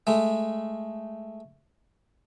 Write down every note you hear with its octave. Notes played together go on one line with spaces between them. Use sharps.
G#3 A3